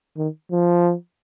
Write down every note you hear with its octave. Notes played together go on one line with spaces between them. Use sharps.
D#3
F3